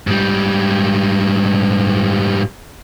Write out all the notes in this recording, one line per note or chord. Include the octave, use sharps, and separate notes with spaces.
G#2 G3